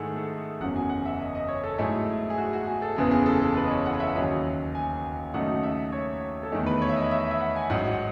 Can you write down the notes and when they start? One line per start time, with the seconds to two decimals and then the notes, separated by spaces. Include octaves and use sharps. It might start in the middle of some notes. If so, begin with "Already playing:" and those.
Already playing: G#2 D#3 A3 E4 G#4 A4 F#5
0.16 A4
0.60 F#1 E2 C#3 F#3 F#5
0.76 G#5
0.89 F#5
1.05 E5
1.20 D#5
1.35 D#5
1.48 C#5
1.64 A4
1.78 G#2 F#3 A3 E4 G#4
2.30 G#4
2.38 F#4
2.53 F#4
2.67 G#4
2.82 A4
2.96 F#1 E2 C#3 E3 B3 G#4
3.11 G#4
3.26 A4
3.41 A4
3.57 B4
3.63 D#5
3.71 C#5
3.85 F#5
4.00 E5
4.15 D#2 C#3 F#3 C#4 D#5
4.75 G#5
5.34 D#2 C#3 F#3 A3 D#4 F#5
5.63 E5
5.92 C#5
6.43 A4
6.51 E2 D#3 A3 G#4
6.66 B4
6.82 C#5
6.89 E5
6.96 D#5
7.11 E5
7.31 E5
7.40 F#5
7.56 G#5
7.70 A1 G#2 F#3 F#5